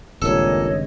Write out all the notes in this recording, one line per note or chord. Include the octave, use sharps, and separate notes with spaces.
G#1 G2 A#2 C#3 A4 C#5 D#5